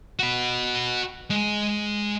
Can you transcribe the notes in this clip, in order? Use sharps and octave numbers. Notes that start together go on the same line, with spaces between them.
F#4 B5
G#3